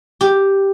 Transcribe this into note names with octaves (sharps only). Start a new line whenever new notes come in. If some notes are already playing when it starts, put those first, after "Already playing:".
G4